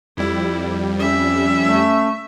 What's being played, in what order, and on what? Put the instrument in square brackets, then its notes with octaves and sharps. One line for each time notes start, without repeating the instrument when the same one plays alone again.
[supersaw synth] F2 G3 [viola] E4
[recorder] C#4 [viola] E5
[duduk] A3